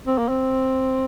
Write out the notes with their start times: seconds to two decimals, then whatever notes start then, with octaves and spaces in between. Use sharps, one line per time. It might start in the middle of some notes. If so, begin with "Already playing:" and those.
0.07 C4
0.18 A#3
0.29 C4